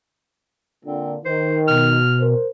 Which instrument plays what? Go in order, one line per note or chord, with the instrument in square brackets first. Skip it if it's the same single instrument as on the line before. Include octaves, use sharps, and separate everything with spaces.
[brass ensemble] A#2 D3 [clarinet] C4
[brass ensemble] D#3 [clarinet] C5
[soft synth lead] B2 [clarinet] F6
[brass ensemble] A#4 C5